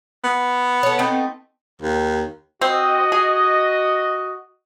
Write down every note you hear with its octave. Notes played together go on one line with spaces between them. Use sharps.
B3
A4 C#5
A3 C4 D#4
D#2
C4 F#4 D#5
G#4